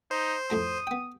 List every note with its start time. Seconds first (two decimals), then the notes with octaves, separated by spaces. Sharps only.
0.11 D#4 C5
0.50 F2 A2 A#5 D#6
0.87 B3 G5